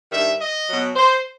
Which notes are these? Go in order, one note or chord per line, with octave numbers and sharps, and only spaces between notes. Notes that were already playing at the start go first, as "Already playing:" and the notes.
G2 D#3 G3 E5
D#5
B2 F#3
C5